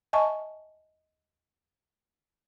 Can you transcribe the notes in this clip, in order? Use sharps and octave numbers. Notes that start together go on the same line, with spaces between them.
D#5 E5 G#5 A5 C#6